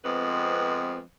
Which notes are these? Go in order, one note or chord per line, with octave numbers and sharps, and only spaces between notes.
F2 G#3 B3 C4 B4